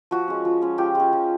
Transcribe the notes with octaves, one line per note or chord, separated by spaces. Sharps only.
F3 F#4
G#3 C#4
F3
G#3 C#4
F3 G4
G#3 C#4
F3